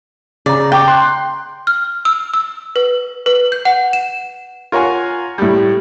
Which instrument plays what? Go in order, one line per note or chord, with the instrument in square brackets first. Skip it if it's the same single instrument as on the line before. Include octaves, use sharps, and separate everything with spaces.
[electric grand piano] C#3 A#5 [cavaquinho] D5
[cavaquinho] G5 [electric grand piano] A#5 C#6 D6
[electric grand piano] C6 F#6
[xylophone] F6
E6
E6
B4
B4
G6
F#5
E7
[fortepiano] F4 A#4 C#5 F#5 G#5
A2 G3